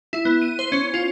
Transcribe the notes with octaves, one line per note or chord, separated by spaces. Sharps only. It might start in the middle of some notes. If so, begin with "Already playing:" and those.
E4
B3
D#7
C5
C#4
F4